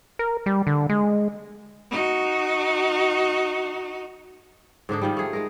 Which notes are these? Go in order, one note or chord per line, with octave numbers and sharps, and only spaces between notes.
A#4
G3
D3
G#3
D#4 F#4
G#2 D3 D4 D#4
D#3 F3 G3
A3 G#4
G#3 A#4